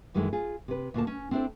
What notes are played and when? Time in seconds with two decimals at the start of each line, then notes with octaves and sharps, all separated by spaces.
0.14 F#2 D#3 E3 G#3 A3
0.33 F4 G#4
0.68 C3 B4
0.94 D2 A#2 A#3 A5
1.07 C#4
1.31 C4 D4 E4 F#4 A4 C5